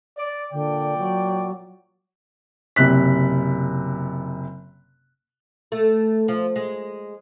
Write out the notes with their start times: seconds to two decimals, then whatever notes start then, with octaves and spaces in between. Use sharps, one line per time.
0.17 D5
0.52 A#2 D3 D5 G5
0.98 F#3
2.76 F#1 C3 F#6 B6
5.72 A3
6.28 F3
6.56 G#3